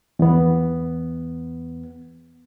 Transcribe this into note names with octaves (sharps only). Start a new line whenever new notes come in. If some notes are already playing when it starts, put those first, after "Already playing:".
E2 B3